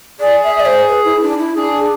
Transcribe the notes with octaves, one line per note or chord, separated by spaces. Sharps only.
G#4 D5
E5
D5
C5
B4
E4
D4
E4
D4 G#4